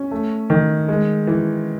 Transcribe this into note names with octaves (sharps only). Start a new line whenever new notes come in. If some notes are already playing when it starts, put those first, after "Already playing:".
Already playing: C#4
A3
D#3
G#3
E3